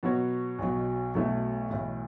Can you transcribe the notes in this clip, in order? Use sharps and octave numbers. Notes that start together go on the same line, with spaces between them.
B2 F#3 B3 F#4 C#5
B1 B2 F#3
B1 B2 F#3 A3 E4
B1 A2 E3